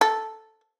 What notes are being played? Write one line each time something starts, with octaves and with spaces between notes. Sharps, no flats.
A4